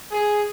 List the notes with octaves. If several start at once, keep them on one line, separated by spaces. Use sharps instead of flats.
G#4